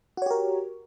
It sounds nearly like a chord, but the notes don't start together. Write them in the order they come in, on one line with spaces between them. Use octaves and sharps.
F#4 C#5 G4 A#4